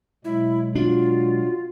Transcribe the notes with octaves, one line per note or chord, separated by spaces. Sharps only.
B2 F#3 G#3 E4
D4 F4 F#4